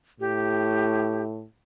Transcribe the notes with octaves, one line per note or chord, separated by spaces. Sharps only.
A2 G4